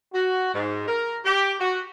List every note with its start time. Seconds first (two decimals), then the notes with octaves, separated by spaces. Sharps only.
0.13 F#4
0.53 G#2
0.87 A#4
1.25 G4
1.59 F#4